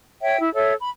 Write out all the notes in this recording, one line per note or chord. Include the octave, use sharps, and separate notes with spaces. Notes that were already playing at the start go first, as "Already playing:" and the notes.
C#5 E5 G5
E4
A4 C#5 E5
B5